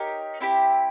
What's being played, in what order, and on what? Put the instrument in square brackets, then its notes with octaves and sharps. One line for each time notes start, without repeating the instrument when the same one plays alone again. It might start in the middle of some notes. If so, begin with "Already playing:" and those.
Already playing: [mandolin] D#4 G4 A#4 C#5
C4 E4 G4